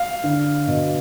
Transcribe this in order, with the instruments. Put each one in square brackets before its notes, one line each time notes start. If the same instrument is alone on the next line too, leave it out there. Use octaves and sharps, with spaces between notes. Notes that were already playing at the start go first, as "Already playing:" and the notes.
Already playing: [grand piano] F5
[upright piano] D3
B2